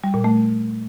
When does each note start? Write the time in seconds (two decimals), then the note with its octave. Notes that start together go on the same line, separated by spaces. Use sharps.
0.04 G3
0.14 A#2
0.24 A3